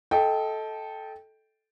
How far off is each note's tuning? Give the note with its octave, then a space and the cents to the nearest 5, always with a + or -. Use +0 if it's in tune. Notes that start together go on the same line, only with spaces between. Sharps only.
A4 -10 D#5 +25 G5 +0